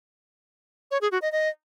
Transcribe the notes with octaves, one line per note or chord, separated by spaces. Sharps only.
C#5
G#4
F#4
D#5
D#5